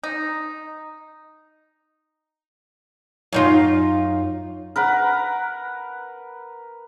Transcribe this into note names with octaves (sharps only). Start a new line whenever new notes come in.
D#4
F#2 D#4 F4
A#4 B4 F#5